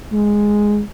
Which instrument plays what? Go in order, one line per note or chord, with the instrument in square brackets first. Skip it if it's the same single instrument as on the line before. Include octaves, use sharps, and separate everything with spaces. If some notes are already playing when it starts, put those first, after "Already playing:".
[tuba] G#3